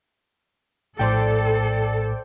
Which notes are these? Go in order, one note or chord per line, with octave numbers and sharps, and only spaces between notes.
A#1 A2 A4 C5 D5 G5